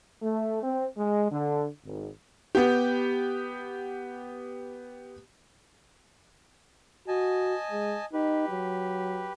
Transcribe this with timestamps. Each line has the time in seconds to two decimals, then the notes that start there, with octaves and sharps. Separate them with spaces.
0.22 A3
0.63 C4
0.98 G#3
1.32 D3
1.85 G#1
2.55 B3 G4
7.08 F#4 D#5 G#5 A5
7.71 G#3
8.13 D#4 G4 B4
8.49 F#3